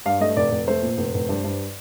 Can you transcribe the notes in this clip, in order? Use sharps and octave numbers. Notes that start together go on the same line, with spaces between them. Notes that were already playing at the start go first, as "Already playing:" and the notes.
G2 F5
A3 D#5
F1 D5
F1
A3 C5
A#2
F1
F1
G2
G2